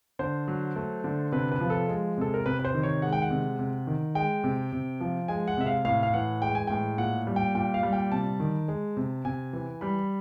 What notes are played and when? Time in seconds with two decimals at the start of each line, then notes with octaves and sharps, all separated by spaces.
0.19 D3 C5
0.48 F#3
0.76 A3
1.04 D3
1.32 C3 B4
1.52 B4
1.60 F3
1.70 A4
1.89 G#3
2.17 C3 A4
2.34 A#4
2.46 C3 B4
2.59 B4
2.65 C5
2.74 D#3
2.83 C#5
3.02 G#3 F#5
3.13 G5
3.22 F#5
3.30 C3
3.59 C3
3.87 D#3
4.15 G#3 G5
4.44 C3
4.72 C3
5.01 F3
5.28 G#3 G#5
5.48 F#5
5.57 C3 E5
5.67 F5
5.85 A2 F5
6.03 F5
6.14 E3 F#5
6.42 G#3 G5
6.55 G#5
6.67 A2 G5
6.98 A#2 F#5
7.27 G3
7.36 G5
7.55 A#2 G5
7.74 F5
7.83 G3
7.93 G5
8.12 C3 A5
8.40 D#3
8.68 G#3
8.97 C3
9.25 C3 G#5
9.53 E3
9.81 G3 B5